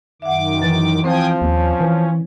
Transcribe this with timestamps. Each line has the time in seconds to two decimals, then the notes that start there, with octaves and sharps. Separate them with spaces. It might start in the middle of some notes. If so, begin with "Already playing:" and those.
0.22 F#2 D#3 E5 F#5 D6
0.62 E3 A6
1.04 F3 C4 C5 G5 G#5 D#6
1.41 D#2 C#4
1.80 E3